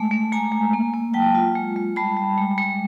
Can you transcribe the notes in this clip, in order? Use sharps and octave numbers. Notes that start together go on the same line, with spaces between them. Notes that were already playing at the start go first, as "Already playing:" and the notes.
Already playing: G#3 A3
A3
G#3 G#5 A#5
G#3
A#3
A#3
F#3 G5 A5
F4
G#3
G#3
G3 A5 B5
G3
G#3
G#3